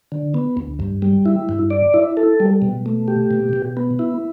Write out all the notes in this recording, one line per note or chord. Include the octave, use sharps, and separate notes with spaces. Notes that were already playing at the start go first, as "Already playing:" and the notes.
D3
B3
D2
G2
G3
E4
G2
D5
E4
A4
G3
B2
A3
G4
B2
B2
B3
E4